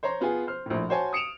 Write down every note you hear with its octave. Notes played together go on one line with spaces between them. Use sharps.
C5 C#5 A#5 C6
B3 F4 G#4 G#5
C5 F6
A#1 A2
F#4 C5 C#5 G#5 A5
D#6 C#7 D7 E7 F7